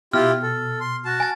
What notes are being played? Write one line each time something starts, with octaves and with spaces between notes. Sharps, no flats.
B2 E4 F4 G4 F6
A4
C6
F#4 A5
G#5 A6